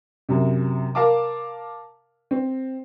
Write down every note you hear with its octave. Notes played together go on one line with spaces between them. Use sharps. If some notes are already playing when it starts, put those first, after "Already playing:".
F#2 C3
A#4 F5 A5 D6
C4